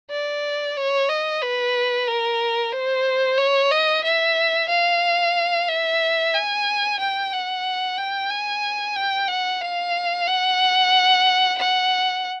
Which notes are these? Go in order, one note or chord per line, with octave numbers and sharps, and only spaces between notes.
D5
C#5
D#5
B4
A#4
C5
C#5
D#5
E5
F5
E5
G#5
G5
F#5
G5
G#5
G5
F#5
F5
F#5
F#5